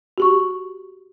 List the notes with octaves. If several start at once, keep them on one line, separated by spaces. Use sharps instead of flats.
F#4 G4 C#6